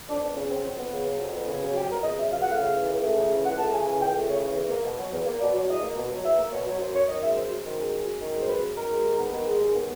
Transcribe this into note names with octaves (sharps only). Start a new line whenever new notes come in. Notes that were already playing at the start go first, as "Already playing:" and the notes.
F2 D4
B3 D4
C#3 C#4
F#3 C4
F2 C4
B3
C#3
F#3
F2
B3
C#3
F#3
F2 G4
B3 A#4
C#3 D#5
F#3 E5
C#2 F5
F#5
A3 F5
C#3
E3
C#2
A3
C#3
E3
C#2 F#5
A3 A5
C#3 G#5
E3 G#5
C#2 G5
A3
C#3 C#5
E3
E2
A#3
B2
F#3
E2
A#3
B2 D5
F#3
E2 D#5
A#3
B2
F#3
E2 E5
A#3
B2 C#5
F#3
F#2 C5
F#2 C#5
D#3 D#5
G#3 E5
F#2 C5
F#2
D#3
G#3
F#2
F#2
D#3
G#3
C5
F#2 B4
F#2
D#3 A#4
G#3
D#2
B3
D#3
G#3
D#2
B3